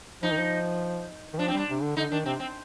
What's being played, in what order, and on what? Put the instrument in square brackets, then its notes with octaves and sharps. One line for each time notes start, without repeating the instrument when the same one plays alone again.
[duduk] F3 [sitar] D#4
[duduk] D#3
F3
D#3
[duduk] F3 [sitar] D4
[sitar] C4
[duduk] G3 [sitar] D4
[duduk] C3
D3
[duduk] D3 [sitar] D#4
[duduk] D#3 [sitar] D4
[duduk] C3 [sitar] C4
[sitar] C4